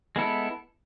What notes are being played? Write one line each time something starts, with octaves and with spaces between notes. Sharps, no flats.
G#3 B3 E4 A4